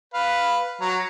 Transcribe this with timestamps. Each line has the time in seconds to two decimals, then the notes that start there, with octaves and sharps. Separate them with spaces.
0.14 B4 F5
0.81 F#3 A#5